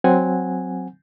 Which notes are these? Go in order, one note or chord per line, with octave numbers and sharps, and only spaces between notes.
F#3 C4 F#5 G#5